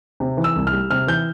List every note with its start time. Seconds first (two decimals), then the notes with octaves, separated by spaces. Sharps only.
0.20 C3
0.37 E3
0.44 E6
0.56 C2
0.67 F6
0.73 G3
0.90 C3 F6
1.07 E3 G6